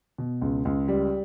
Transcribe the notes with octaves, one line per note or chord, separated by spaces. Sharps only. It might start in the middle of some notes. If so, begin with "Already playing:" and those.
B2
C#2
C#2
G3